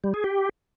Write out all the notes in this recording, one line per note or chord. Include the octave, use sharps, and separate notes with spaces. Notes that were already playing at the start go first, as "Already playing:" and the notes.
G3
G#4
G4